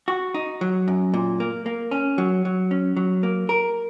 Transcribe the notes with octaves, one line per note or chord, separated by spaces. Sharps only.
F#4
D#4
F#3
F#2
A#2
A#3
A#3
C#4
F#3
F#3
C#4
F#3
A#3
A#4